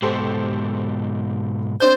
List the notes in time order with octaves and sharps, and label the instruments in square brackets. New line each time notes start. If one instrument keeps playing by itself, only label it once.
[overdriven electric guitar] G#2 B2 [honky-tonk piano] G4 A4 C5
[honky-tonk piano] C4 D4 G6 [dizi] C5